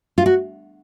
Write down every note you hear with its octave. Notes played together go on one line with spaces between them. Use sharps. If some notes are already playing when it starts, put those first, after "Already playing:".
F4
F#4